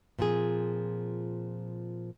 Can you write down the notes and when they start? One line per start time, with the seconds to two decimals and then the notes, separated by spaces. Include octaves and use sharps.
0.19 A#2 F3 C4 G#4